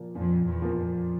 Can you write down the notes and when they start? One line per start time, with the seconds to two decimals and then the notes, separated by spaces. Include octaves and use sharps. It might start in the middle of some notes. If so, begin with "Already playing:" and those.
Already playing: A#2 F3 A#3
0.15 F2 A#2
0.46 E2
0.62 F3 A#3
0.78 F2